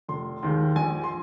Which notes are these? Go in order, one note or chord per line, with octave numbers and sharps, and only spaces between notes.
F1 C6
D#2 D#3 G#3 C6
A#1 G#5
C6